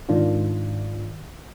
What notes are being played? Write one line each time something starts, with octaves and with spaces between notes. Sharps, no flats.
G#2 D#3 D4 F4